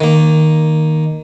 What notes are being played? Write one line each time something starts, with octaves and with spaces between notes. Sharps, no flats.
D#3 A#3